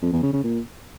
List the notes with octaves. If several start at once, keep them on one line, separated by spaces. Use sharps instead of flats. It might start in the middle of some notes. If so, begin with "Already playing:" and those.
F2
E2
C#3
C#3
A#2